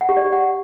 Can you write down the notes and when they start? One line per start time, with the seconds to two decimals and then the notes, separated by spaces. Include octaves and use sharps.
0.01 F#5
0.09 G4
0.17 D5
0.25 G4
0.32 F#5